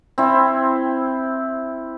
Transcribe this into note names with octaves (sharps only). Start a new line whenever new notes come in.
C4 E4